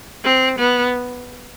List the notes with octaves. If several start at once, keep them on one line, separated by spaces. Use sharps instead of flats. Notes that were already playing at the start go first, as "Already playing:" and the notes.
C4
B3